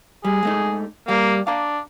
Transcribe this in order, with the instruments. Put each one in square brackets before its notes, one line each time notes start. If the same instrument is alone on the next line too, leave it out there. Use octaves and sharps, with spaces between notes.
[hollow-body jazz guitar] G3 [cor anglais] G#4
[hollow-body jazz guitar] G#3 A3 D#4
[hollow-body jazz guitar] G3 F5 [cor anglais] A#3
[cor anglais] D4 [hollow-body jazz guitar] F5 A#5